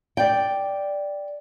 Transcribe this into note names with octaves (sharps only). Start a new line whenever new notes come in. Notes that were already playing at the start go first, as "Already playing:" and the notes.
D5 G5